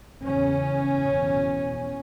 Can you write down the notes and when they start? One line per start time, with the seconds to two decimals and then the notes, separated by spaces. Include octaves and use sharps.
0.25 E2 C#3 C#4
1.05 E2 B2